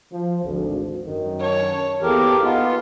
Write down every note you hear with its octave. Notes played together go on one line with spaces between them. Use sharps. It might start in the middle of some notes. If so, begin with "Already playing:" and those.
F3
G#1 D2
F#2 D#3
C#5 A5
E2 A#3 G4 A4 A#4
B3 D#4 F4